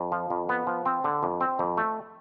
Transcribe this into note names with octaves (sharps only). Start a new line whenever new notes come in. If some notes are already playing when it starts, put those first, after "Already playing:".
Already playing: F2
F3
F2
B3
F3
C4
D3
F2
C4
F2
A3